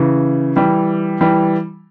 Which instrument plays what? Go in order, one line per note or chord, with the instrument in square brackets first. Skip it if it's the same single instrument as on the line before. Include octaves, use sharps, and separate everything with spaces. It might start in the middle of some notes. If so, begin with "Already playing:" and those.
Already playing: [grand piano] C#3 E3
E3 G3
E3 G3